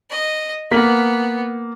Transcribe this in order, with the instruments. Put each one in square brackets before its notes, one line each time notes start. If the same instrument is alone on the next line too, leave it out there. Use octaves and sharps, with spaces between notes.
[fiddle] D#5
[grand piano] A#3 B6 [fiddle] B3